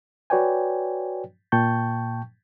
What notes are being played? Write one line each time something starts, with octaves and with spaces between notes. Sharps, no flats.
F#4 B4 C#5 D5 G5 G#5
A#2 G5 A5 C#6 G6